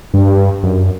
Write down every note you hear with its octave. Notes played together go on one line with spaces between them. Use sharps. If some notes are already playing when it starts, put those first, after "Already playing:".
G2
F#2